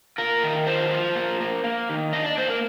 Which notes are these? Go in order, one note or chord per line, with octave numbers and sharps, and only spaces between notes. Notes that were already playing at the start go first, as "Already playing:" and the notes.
F4 A#4
D#3
F4 C5
F4
A#3
A#3
A#3
D#3
D4 D#5
D5
A#3 C5
A#4